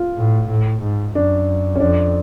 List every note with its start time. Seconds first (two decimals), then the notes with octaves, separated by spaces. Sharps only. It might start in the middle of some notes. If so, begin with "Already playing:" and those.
Already playing: F4
0.17 A2
0.49 A2
0.82 G#2
1.15 F#2 D4
1.75 C#4
1.80 F2 D4